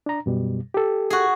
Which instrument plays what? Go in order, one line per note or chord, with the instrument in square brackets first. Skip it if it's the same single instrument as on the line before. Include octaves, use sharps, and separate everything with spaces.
[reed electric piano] D4 A#5
F#2 B2 G3
G4 A4
[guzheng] F#4 G#4